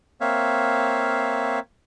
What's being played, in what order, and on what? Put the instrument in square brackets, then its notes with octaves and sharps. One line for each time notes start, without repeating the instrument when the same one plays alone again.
[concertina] A#3 C4 C#5 E5 F5